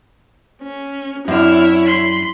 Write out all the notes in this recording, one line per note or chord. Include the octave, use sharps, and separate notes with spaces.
C#4
F#2 C4 D4 E4 C#5 F6
B5 C6